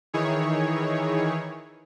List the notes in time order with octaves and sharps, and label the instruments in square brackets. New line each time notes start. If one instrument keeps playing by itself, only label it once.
[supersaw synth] D#3 E3 D#4 E4 G#4 C#5